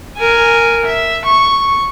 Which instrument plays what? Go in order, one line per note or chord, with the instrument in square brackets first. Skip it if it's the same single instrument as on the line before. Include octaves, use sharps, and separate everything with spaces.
[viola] A#4 G#5
E5
C#6